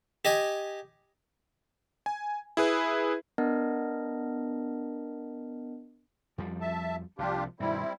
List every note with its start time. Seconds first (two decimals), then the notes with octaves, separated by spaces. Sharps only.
0.25 G4 D#5 G#5
2.06 G#5
2.57 E4 G#4 B4
3.38 B3 D4 A#4 D#5
6.38 F2 F3 G3
6.61 E5 A5
7.18 C2 C3 F3 D4 F4 G4
7.60 G2 B2 D#3 G3 C4 E4